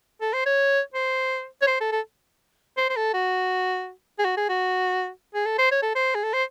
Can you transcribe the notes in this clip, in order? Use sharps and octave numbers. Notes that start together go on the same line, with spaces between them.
A4
C5
C#5
C5
C#5
C5
A4
A4
C5
C5
A4
F#4
G#4
F#4
G#4
F#4
G#4
A4
C5
C#5
A4
C5
G#4
A4
C5